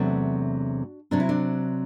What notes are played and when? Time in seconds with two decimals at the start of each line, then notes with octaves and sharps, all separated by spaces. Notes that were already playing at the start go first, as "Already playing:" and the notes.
Already playing: E2 C3 F#3 A3 D4 F#4
1.11 C3 F#3 C4 D4
1.20 E4
1.29 D4